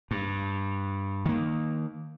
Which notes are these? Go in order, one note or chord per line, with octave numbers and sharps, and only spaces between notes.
G2
D#3 A#3